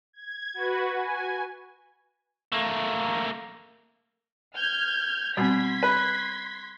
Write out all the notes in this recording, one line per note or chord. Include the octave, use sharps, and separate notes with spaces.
G#6
F#4 B4
G#5
A3 A#3
F6 G6 G#6
B2 G3 C4 C6 G#6 B6
B4